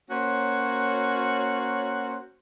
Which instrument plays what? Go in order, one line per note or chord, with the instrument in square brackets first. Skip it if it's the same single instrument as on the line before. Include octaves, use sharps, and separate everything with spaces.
[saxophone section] A#3 C#4 F#4 C5 C#5